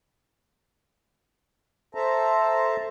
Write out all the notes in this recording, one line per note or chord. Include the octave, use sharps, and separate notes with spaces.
A4 C5 E5 A5 A#5